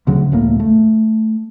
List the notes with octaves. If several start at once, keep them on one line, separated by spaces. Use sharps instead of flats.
D2 C#3 F#3
E1 C#2 A2 A#3
A3